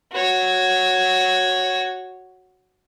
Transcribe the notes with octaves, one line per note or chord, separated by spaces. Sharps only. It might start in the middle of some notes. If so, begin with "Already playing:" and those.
F#4 C#5